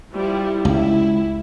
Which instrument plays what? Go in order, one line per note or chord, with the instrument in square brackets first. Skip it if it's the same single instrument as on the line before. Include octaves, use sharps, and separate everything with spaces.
[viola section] F3 G3 E4
[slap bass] C#2 [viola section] E4